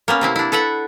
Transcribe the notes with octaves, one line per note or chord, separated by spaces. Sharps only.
A#3 B3 C#4
C3 C4 E4
D4 E4
A4 B4 E5 F#5